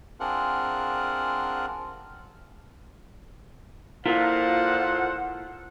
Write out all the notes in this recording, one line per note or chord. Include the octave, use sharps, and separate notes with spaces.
C4 D4 F4 G#4 A#4 F#5
A#2 E4 F4 A4 A#4 C5 F5 F#5